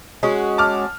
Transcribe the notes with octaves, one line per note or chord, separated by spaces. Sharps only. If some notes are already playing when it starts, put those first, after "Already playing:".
G#3 C#4 F#4
A5 D6 F6